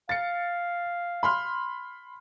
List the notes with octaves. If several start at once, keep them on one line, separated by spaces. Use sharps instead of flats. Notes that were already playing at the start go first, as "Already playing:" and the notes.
F5 A6 C#7
B5 C6 F6